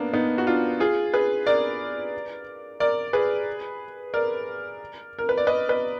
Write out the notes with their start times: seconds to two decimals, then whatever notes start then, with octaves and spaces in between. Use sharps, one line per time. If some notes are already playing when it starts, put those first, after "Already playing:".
Already playing: A#3 B3 D4
0.13 B3 D#4
0.38 F#4
0.47 D4 F4
0.80 F4 G#4
1.14 G#4 B4
1.47 A#4 D5
2.80 A#4 D5
3.13 G#4 B4
4.14 A#4 D5
5.19 A#4
5.29 B4
5.38 D5
5.47 B4 D#5
5.69 B4 D#5